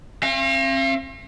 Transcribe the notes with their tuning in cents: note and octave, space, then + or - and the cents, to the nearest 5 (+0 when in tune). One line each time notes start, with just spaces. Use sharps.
C4 +40 F5 -40